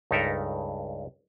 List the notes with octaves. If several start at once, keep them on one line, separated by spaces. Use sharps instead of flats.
C#2 G2 D#4 A4 A#4 E5